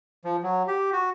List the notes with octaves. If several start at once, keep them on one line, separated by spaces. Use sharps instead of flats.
F3
F#3
G4
F#4